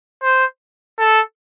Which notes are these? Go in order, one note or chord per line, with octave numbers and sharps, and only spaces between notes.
C5
A4